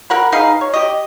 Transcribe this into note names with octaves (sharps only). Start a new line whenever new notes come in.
A#4 F#5 B5
D#4 G#4 B4 F5
C#5
G4 D#5